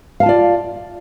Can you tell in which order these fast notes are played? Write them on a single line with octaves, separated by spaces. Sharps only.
F5 A5 F4 D5